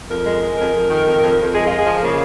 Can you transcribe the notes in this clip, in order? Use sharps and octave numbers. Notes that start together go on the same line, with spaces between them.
F2 A#4
G#3
G#3
F2 A#4
F2
D#3
F2
F2
F2
G#3 G#4
G#3 F4
G#4
F3
C#3 A#3